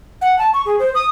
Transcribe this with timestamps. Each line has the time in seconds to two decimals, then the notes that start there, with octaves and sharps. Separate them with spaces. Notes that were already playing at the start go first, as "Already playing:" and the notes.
0.22 F#5
0.39 A5
0.54 C#6
0.66 G#4
0.79 C5
0.95 D#6